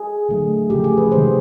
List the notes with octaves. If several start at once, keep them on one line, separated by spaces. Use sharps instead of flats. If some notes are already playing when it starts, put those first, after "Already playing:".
Already playing: G#4
D3 F#3 A3
C#3 F3 A3 G4
G#4
B4
C3 D#3 G#3 C5